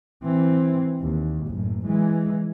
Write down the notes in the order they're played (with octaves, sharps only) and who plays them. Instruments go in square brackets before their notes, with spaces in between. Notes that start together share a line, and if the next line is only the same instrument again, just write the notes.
[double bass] E3 C4
D#2
F#1 A2
E3 G#3